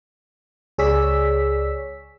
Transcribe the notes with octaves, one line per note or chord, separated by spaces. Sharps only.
C#2 G#4 C#5 D5 E6 B6